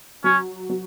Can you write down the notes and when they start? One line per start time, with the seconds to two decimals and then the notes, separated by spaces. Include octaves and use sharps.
0.24 F#3 C#4
0.69 F#3